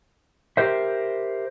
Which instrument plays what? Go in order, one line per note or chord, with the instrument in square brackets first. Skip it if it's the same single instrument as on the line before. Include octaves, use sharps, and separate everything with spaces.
[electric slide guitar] G4 A#4 C5 E5